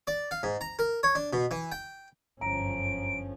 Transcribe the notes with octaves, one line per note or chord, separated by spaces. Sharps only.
D5
F5
G#2
A#5
A#4
C#5
D4
B2
E3
G5
G1 F#2 D3 F3 C#4 A#5 D7